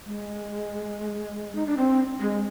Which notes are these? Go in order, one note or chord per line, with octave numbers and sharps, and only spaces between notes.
G#3
D#4
D4
C4
G#3